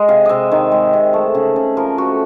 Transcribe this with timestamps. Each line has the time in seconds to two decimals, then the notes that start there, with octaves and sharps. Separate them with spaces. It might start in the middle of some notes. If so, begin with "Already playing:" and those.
Already playing: G#3
0.09 C3 F5
0.25 C3 D#5 E5
0.52 D#3
0.72 G#3
0.93 C3
1.13 A3
1.35 C#3
1.56 C#3
1.77 F3 A#4
1.98 A3 F#4